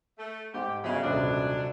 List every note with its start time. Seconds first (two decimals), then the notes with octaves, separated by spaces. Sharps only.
0.19 A3
0.54 G#2 G4
0.84 G1 C#3 F#4 D#5 B5
1.04 D#1 C#2 C3 F#3 D4 F#6